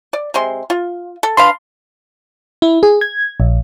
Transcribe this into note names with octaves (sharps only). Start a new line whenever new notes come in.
D5
C3 G#3 C6
F4
A4
D4 B4 F5 C6
E4
G#4
G#6
A#1